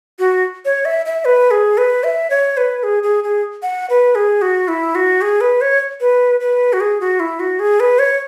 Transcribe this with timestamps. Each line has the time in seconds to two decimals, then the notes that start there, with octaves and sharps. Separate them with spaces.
0.19 F#4
0.65 C#5
0.85 E5
1.06 E5
1.25 B4
1.51 G#4
1.78 B4
2.04 E5
2.30 C#5
2.57 B4
2.83 G#4
3.03 G#4
3.24 G#4
3.62 F#5
3.90 B4
4.15 G#4
4.42 F#4
4.68 E4
4.95 F#4
5.22 G#4
5.41 B4
5.61 C#5
6.01 B4
6.40 B4
6.73 F#4
6.80 G#4
7.00 F#4
7.20 E4
7.40 F#4
7.59 G#4
7.80 B4
7.99 C#5